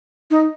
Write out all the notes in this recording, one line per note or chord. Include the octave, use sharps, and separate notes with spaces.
D#4